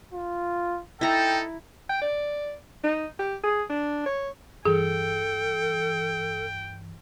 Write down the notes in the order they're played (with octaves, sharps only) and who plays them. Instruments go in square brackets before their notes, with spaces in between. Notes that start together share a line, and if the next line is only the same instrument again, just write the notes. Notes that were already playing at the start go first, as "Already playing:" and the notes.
[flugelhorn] F4
[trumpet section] D#4 A4 [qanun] E4 A#5 [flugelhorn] G5
[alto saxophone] G5
D5
D#4
G4
G#4
D4
C#5
[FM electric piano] G2 E3 [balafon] G#4 [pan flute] A4 [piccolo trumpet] G5